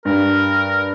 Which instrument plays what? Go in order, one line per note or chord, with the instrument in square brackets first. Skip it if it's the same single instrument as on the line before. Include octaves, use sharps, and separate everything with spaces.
[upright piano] G2 [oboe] A#4